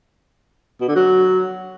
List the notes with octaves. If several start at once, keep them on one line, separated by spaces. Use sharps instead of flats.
B2
D3
F#3